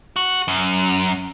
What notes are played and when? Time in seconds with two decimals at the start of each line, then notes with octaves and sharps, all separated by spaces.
0.16 F#4
0.48 F#2